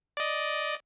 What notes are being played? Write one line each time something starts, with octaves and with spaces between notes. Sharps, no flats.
D5 D#5